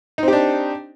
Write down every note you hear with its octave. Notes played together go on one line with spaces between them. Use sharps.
C4 D4 D#4 G4